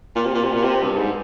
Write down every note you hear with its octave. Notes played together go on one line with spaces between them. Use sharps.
A#2
C3
A#2
C3
A#2
C3
G2
G#2